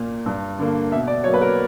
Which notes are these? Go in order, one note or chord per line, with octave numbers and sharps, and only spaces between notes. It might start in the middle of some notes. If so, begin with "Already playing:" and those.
Already playing: A#2 A#3
G2
D3 A#3
B2 E5
D5
F#3 A#3 C#5
B4
A#4